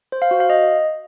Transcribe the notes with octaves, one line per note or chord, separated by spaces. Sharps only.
C5
F5
F#4
F5
D#5